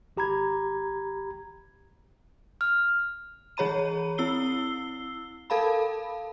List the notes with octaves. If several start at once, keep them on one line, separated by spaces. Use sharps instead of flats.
G#1 G4 A#5 B5 G#6
F6
E3 G#4 C#5 A#5 B5 D#7
C4 E4 E6 C7 G7
A4 A#4 F5 A5 B5